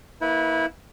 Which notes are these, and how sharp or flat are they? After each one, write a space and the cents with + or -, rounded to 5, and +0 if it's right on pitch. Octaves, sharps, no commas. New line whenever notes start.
A#3 +0 E4 -20 B4 +0